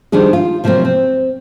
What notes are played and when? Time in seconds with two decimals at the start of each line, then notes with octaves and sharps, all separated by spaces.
0.12 D#3 F3 G3 D4 G#4
0.33 F4
0.64 C3 F3 F#3 A#3 C4
0.85 C4